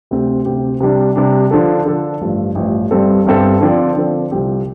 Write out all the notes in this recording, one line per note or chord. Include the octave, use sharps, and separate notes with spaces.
D2 C3 A3 C4 G4
D2 C3 A3 C4 G4
C3 G3 D4
C3 G3 D4
D3 F3 D4 A4
D3 F3 D4 A4
A1 G2 F3
A1 G2 F3
G1 G2 G3 C4 A4
G1 G2 G3 C4 A4
D3 F3 C4 A4 D5
D3 F3 C4 A4 D5
C2 C3 F3 C4 G4